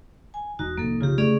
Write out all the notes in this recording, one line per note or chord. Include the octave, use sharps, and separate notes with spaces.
G#5
E1 D#4 F#4
C2 F2 A#3 A4
C#3 F4 G4
A3 C#4 G#4 D5